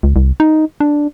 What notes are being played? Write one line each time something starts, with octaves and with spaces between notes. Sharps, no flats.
C#2
C2
D#4
D4